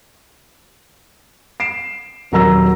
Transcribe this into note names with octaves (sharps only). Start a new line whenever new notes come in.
C7 D7 E7
D#1 F#3 A#4 A#5 E6 A#6